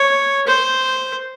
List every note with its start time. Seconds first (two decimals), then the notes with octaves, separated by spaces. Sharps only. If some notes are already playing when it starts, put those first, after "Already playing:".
Already playing: C#5
0.47 C5